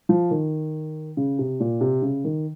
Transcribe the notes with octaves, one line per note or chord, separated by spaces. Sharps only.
F3
D#3
C#3
C3
A#2
C3
C#3
D#3